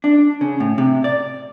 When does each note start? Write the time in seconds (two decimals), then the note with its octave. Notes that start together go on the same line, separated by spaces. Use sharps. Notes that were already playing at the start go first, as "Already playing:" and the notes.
0.04 D4
0.41 C#3
0.60 A2
0.78 C3
1.04 D5